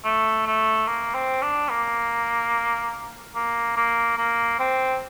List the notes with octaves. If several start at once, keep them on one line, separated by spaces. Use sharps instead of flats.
A3
A3
A#3
C4
D4
A#3
A#3
A#3
A#3
C4